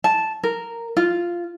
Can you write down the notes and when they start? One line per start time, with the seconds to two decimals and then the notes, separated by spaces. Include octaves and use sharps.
0.04 A5
0.43 A#4
0.97 F4